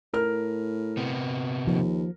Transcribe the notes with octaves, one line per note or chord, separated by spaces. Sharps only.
A2 A#4 F6
C3 B3
D#2 F3